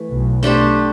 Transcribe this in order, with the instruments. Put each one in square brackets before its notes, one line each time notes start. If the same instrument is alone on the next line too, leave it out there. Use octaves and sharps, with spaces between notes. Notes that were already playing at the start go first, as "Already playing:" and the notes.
Already playing: [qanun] E3 A3
[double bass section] B1 B2
[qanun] A3 D4 G4 C5